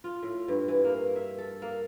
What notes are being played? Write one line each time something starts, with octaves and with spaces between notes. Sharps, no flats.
F4
A2
G2
E3
A#3
E5
A4
A#3